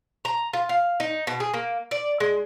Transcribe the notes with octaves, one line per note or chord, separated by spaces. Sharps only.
A#5
F4
F5
D#4
B2
G#4
A#3
D5
G#3